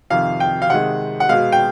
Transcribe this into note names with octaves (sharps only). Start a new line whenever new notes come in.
F2 C3 D#3 F5
G5
F5
C3 D#3 G#3 F#5
F#5
B2 G#3 F5
G5